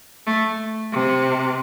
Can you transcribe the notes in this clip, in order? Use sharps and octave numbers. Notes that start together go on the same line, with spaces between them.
A3
C3